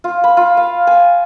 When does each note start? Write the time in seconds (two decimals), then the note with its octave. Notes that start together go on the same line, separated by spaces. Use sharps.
0.04 F4
0.24 B5
0.37 F4
0.57 F5
0.87 G#5